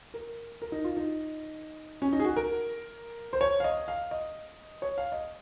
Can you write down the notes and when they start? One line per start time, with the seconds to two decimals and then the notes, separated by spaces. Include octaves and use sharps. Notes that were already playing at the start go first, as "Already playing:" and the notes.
0.14 A#4
0.62 A#4
0.72 D#4
0.85 F4
0.97 D#4
2.02 C#4
2.13 D#4
2.20 G#4
2.25 F#4
2.36 A#4
3.33 C5
3.41 C#5
3.60 F5
3.64 D#5
3.88 F5
4.11 D#5
4.82 C#5
4.98 F5
5.12 D#5